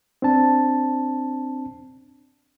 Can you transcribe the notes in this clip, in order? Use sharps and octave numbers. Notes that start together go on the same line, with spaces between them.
C4 D4 A5